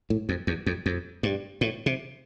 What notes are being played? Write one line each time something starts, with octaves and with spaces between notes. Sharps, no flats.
A2
F2
E2
F2
F2
G2
A2
C3